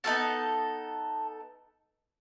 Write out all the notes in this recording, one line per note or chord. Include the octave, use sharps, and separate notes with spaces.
B3 D#4 F#4 A4 A5